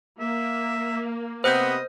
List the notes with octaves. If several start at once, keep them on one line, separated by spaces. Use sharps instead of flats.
A#3 E5
C3 B3 C5 D#5 G6